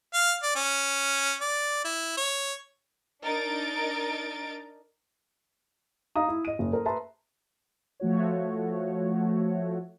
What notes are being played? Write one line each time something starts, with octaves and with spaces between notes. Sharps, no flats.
F5
D5
C#4
D5
E4
C#5
D4 D#4 A#4 D#5 A6 D7
D#4 F5 A#5 D#6
E4
D#5 D#7
F#1
A4 A#4 C5
B4 E5 A5 A#5 C6
F3 A3 F#4 C#5